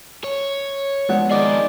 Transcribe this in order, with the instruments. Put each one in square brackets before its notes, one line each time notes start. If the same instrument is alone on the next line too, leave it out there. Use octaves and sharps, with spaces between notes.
[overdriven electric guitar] C#5
[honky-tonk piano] F3 B3 D4 [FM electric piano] G#3 F#5
[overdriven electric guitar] D#3 G#4 [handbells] D5 D#5 D6